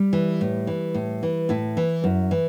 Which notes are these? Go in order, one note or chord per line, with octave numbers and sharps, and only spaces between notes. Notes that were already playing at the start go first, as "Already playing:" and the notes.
Already playing: G3
E3
A2
E3
A2
E3
A2 E4
E3
F#2
E3